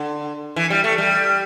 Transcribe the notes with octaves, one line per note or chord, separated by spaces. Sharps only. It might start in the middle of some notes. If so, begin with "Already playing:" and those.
Already playing: D3
E3
G3
A3
G3